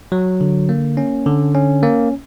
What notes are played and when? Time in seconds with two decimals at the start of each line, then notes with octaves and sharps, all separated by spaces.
0.12 F#3
0.41 D3
0.69 A#3
0.97 C#4
1.26 D3
1.55 C#4
1.83 A#3